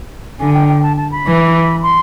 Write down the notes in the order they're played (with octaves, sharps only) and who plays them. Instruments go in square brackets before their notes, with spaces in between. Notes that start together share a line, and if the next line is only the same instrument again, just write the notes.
[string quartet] D3 [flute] G#5
[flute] G5
G5
A5
A5
B5
[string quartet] E3
[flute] C6